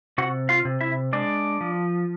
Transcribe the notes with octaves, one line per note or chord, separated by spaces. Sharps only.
C3 F#4 F#5
F4 F5
C3
E4 E5
G#3 D4 D5
F3